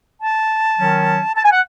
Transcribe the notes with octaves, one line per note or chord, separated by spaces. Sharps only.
A5
D#3 F#3 C#4
A5
G#5
F#5